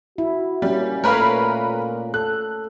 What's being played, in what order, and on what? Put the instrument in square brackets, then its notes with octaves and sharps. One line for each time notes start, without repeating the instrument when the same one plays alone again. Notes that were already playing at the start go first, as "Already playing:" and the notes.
[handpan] E4 [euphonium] F#4
[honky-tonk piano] G3 [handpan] A#3 C#4
[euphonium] A#2 [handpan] A3 C#5 F5 [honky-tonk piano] A#4 B4 B5
[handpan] A4 [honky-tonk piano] F#6